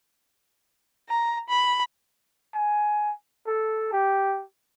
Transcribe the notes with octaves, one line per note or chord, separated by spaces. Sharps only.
A#5
B5
G#5
A4
G4